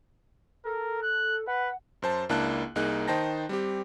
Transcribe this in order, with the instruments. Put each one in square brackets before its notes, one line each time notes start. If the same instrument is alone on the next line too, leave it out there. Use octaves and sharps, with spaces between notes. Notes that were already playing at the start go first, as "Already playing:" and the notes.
[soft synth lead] A4 [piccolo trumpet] A#4
[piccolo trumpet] F#6
[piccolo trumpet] B4 [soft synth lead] F#5
[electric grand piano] F#2 C5 A5
C#2 A#3 D4 E4 A5 F#6
C2 A#3 D#4 G#4 F#6
D#3 D#4 C5 G5 A5 A#6
G3 C4 G4